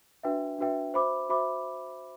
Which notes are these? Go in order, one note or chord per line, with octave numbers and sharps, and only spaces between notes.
D4 F#4 B4 E5 G5
D4 F#4 B4 E5 G5
F#4 C5 E5 B5 D6
F#4 C5 E5 B5 D6